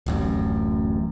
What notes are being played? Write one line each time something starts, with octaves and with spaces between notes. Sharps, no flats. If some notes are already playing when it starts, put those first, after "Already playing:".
D1 A1 F#2